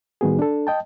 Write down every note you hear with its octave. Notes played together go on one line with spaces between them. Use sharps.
A2 D#3 G3 B3 F#4 G#4
D4 A4
D#5 G5 A5